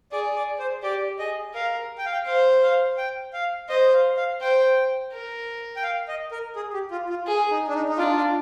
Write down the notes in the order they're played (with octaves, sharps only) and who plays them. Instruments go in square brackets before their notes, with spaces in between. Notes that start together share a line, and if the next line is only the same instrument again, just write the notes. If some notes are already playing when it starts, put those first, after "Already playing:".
[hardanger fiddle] G#4 [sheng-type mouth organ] D5
[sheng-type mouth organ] D5
C5
[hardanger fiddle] G4 [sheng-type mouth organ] D5
[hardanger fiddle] G#4 [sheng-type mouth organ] D#5
[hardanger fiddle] A#4 [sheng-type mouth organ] F5
[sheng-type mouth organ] G5
F5
G5
[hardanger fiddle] C5 [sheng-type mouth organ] F5
[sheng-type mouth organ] F5
G5
F5
[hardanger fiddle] C5 [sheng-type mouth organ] D#5
[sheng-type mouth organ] F5
F5
[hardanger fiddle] C5 [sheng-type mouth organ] G5
[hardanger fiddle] A#4
[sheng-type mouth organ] G5
F5
D#5
A#4
G#4
G4
F4
F4
[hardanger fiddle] G#4
[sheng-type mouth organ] D#4
D4
D#4
D#4
[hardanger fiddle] D4 [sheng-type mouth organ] F4
[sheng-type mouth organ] F4